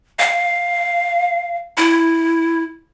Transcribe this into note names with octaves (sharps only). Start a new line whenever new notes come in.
F5
E4